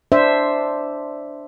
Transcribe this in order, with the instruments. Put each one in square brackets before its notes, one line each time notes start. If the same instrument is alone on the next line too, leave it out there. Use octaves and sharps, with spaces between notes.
[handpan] D4 C5 E5